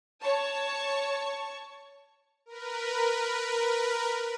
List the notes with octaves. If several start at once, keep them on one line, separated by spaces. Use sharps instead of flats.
C#5 A5 C#6
A#4 B4